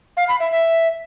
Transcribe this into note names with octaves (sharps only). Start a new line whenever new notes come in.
F5
B5
E5
E5